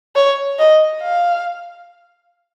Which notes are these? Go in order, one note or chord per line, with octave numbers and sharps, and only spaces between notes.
C#5
D#5
F5